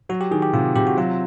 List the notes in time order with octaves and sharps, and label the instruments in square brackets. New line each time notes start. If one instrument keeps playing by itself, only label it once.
[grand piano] F#3 [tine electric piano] F#4
[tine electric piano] G4
[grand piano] D#3 [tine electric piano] G#4
[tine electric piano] G4
[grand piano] C3 [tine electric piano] F4
[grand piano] C3 [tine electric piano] G4
[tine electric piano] F#4
[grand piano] F#3 [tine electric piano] F4